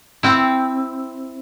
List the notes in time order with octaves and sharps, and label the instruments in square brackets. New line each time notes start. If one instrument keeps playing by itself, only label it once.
[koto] C4 E4